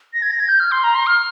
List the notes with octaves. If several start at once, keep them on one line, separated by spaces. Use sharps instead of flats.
A#6
G#6
A#6
G#6
G6
F6
C6
A#5
C6
F6